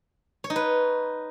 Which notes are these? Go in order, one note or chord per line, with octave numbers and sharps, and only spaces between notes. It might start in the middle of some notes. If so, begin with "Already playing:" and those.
C#5
D#4
B4